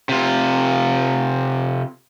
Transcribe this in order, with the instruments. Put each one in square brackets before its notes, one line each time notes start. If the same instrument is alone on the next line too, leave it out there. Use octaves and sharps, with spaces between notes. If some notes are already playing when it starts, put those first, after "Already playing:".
[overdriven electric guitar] C3 F4